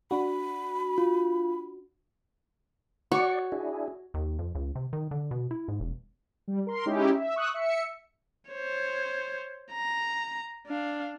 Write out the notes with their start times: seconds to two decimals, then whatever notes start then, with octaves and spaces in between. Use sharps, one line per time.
0.11 D4 F#4 B5
0.98 F4
3.12 F#4 C#5 D5 C#6
3.52 D4 E4 G#4
4.14 D#2
4.39 F2
4.55 C#2
4.75 C3
4.93 D#3
5.11 D3
5.31 B2
5.51 E4
5.68 G#2
5.80 E1
6.48 G3
6.67 A#4 C6
6.86 G#3 C#4 D#4 E4 G4
7.15 E5
7.36 C#6 D#6 E6 F#6
7.54 E5 C#7
8.50 C5 C#5
9.72 A#5
10.67 D4 F5